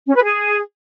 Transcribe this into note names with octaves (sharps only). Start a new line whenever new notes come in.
C#4
B4
G#4